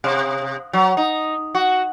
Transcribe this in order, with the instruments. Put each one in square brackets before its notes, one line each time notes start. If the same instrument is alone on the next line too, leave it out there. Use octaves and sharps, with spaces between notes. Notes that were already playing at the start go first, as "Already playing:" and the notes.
[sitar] C3
F#3
D#4
F#4